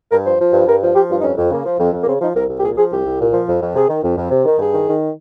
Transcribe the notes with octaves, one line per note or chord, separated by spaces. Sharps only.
G2 A#4
F3 C5
F3
G2
G2 A#4
F3
F3 G4
G2 F4
D#4
F2 C#4
F2
C#3 A#3
F3
F2
F2
A#3
C#3 C4
F3 D#4
C2 A#4
C2
G4
A#2 G#4
F3 G#4
C2 G4
C2
A#2
F3
F2
F2
C3 G#4
D#3
F2
F2
C3
D#3
G2 G#4
D#3
D#3